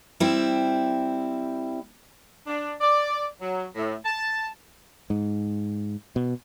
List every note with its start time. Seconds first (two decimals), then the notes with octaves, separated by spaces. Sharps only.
0.20 G3 C4 E4
2.47 D4
2.81 D5
3.41 F#3
3.76 A2
4.05 A5
5.10 G#2
6.16 B2